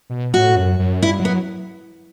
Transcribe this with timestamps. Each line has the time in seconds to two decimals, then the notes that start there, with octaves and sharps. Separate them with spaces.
0.10 B2
0.33 A2 F#4
0.56 F#2
0.79 F#2
1.02 G2 E4
1.20 F#3
1.25 B3